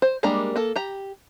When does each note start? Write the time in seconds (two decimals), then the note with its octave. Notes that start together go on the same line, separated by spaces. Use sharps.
0.02 C5
0.23 G3 G#3 A#3 D4 A#5
0.56 A#3 A4
0.76 G4 A#5